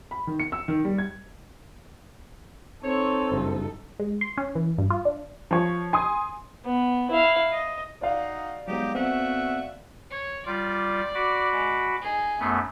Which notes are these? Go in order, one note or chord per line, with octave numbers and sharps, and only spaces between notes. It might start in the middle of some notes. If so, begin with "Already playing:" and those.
B5
D#3
C#7
E6
D#3
G3
G#6
C4 D#4 A4 C#5
F#1 G2
G#3
C6
C#4
E3
G2
F4
D4
F3 C#5
G#5 C6 D#6
B3
E4 F5
D#5
D#4 F#4 D5 F5
F#3 G#3 B3 D#4 G4
A3 B3 C4 F#4 E5
C#5
G3 F4 D5
F#4 B5 D6
G#3
D#4 G#4
F#2 A3 B3